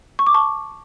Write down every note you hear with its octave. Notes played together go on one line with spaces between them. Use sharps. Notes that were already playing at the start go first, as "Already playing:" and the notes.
C#6
D6
A5 C#6